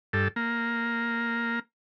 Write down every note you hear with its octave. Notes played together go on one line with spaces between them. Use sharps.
G2 A4
A#3